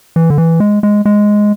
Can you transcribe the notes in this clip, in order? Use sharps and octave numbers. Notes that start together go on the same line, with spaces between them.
E3
D3
E3
G#3
G#3
G#3